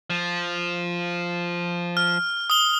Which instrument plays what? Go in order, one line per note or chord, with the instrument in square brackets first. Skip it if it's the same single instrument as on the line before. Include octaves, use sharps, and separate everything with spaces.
[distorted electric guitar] F3
[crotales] F6
D#6 G7